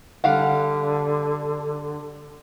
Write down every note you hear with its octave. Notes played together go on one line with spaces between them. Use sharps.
D3 G3 F5 F#5